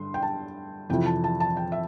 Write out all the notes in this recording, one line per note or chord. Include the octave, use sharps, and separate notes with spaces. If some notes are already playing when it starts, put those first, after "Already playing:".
Already playing: G2 D3 C6
G5
A5
F2 C3 E3 G5
A5
A5
A5
G5
E5